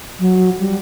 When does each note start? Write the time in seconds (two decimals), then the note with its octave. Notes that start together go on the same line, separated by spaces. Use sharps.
0.19 F#3
0.59 G3